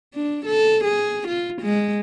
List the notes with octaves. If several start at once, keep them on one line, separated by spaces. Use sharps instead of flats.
D4
A4
G#4
F4
G#3